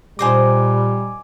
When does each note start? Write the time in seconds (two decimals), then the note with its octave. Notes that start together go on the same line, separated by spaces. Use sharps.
0.19 A#2 G3 D#4 C5 D#5 G#5 D6